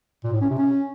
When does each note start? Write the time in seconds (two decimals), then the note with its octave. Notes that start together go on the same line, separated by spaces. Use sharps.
0.24 A#2
0.33 A2
0.41 C#4
0.50 C3
0.59 C#4